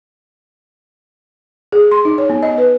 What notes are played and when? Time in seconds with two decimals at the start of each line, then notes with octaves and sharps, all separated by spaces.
1.72 G#4
1.92 C6
2.05 D#4
2.18 C#5
2.30 B3
2.43 D#5
2.58 B4